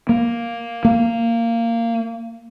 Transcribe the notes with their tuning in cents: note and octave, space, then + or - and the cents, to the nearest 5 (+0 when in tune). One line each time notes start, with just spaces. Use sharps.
A#3 +5
A#3 -15